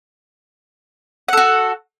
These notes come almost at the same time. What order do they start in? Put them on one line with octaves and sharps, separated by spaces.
F#5 A4 F#4